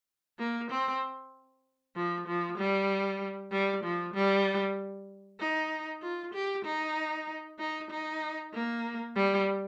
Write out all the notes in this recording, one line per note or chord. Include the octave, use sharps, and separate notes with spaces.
A#3
C4
F3
F3
G3
G3
F3
G3
D#4
F4
G4
D#4
D#4
D#4
A#3
G3